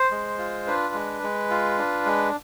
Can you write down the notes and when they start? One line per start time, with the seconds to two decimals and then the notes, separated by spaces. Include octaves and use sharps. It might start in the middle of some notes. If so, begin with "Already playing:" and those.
Already playing: C5
0.11 G#3
0.39 F4
0.67 D4 B4
0.94 G#3
1.23 G#3
1.50 F4
1.78 D4
2.06 G#3